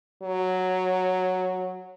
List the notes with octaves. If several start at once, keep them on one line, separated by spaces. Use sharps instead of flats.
F#3